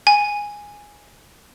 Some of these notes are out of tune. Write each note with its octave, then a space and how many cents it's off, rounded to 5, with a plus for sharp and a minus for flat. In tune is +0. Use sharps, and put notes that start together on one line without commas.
G#5 -5